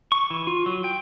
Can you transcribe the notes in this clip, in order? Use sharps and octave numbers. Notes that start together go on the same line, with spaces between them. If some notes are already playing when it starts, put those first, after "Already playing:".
C#6
E3
F4
F#3
G5